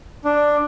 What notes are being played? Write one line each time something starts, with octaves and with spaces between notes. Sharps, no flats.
D4